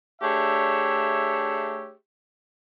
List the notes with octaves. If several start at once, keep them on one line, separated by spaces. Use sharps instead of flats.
A3 D4 G4 G#4 C#5 E5